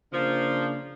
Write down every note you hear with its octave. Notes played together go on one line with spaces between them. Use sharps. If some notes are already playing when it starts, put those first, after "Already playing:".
C#3 F3 A#3 D4